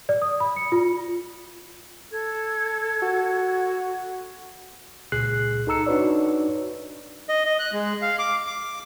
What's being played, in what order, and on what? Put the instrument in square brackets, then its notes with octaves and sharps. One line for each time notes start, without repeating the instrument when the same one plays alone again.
[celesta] D5
D#6
B5
C#7
F4
[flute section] A4 G#6
[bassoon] F#4
[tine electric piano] C#2 A#2 G#4 F#6 C7
D#4 A4 A#5 E6 C#7
D4 D#4 F#4 B4 C#5 D5
[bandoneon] D#5
D#5
F#6
G#3
F5
D6
D6